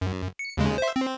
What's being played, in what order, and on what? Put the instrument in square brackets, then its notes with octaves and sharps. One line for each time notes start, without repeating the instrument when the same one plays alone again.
[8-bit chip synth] F#2
C#7
D#2 C#3 G#3
C5 E5
C4